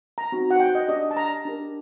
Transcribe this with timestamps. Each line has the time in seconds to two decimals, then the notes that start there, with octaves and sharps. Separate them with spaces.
0.18 A#5
0.32 C4 D#4 F#4
0.51 F#5
0.60 G5
0.75 D#5
0.88 D4 G4 D5 D#5
1.11 A5
1.17 A#5
1.45 D4 G4 A#4